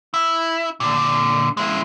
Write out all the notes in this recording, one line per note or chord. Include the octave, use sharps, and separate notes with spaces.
E4
A#2 D3
G#3 E4